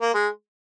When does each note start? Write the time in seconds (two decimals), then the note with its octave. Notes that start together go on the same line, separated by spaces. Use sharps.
0.01 A#3
0.14 G#3